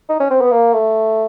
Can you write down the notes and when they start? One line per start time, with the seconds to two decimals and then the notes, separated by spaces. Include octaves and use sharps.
0.09 D#4
0.20 C#4
0.30 C4
0.41 B3
0.52 A#3
0.73 A3